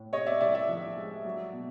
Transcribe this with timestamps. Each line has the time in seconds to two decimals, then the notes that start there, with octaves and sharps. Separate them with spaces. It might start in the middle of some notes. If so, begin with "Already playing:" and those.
Already playing: A2
0.12 C3 C#5 D#5
0.26 D5 E5
0.40 C2 D5 E5
0.55 D5 E5
0.69 F3
0.96 G#3
1.25 F#3
1.53 B2